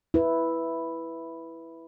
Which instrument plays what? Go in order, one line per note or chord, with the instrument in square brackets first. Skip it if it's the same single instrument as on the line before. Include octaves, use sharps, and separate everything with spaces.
[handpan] E4 B4